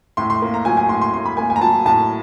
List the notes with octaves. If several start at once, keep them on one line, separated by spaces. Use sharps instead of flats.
A2 C6
C6
A#3
A#5
F#3 G#5
G#5
A2 C6
C6
A2 C6
B5
A#3 G#5
G#5
A#5
F#3 A5
A2 A5